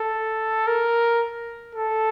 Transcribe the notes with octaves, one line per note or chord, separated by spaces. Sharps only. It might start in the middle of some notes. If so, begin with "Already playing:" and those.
Already playing: A4
A#4
A4